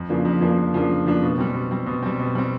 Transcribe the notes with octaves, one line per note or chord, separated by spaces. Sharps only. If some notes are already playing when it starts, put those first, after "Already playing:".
Already playing: F2
C#3 F3 A#3 D4
F2
C#3 F3 A#3 D4
F2
C#3 F3 A#3 D4
F2
C#3 F3 A#3 D4
B2
G3 C4
B2
G3 C4
B2
G3 C4
B2
G3 C4